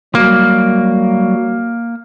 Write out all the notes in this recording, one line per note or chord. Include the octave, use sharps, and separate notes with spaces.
F#3 G3 A#3 F#4